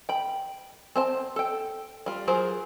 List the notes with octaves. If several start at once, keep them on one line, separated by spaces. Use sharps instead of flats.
G5 B5
C4 C5 A5
A4 G5
G3 F4
F#3 F4 G#4 A#4 C5